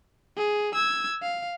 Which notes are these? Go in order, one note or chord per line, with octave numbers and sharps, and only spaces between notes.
G#4
E6 G#6
F5